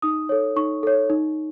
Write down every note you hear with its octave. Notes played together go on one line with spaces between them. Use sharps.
D#4 D#6
A4 C#5
D#4 C#6
A4 C#5
D#4